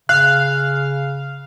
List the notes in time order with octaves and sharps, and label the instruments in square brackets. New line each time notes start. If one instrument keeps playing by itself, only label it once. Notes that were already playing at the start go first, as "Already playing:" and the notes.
[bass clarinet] C#3 [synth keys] F5 [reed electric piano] F#6